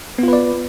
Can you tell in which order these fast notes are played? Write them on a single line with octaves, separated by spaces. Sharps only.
B3 F4 B4 D5